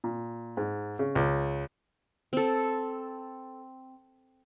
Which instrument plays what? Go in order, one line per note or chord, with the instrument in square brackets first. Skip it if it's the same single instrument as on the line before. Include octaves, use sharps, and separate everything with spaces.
[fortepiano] A#2
G#2
C#3
C#2
[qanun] C4 A4